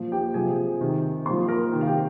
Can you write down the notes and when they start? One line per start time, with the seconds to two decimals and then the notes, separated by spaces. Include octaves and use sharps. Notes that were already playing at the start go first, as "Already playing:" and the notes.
Already playing: A#2 F3
0.12 G4 G5
0.34 C3 F3 G#4 G#5
0.81 C3 D#3
1.25 A#2 C5 C6
1.31 F3
1.48 A#4 A#5
1.72 C3 D#3
1.81 F5
1.87 G4 G5